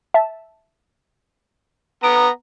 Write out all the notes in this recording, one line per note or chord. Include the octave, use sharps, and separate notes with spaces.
E5 A5
B3 A#5 D7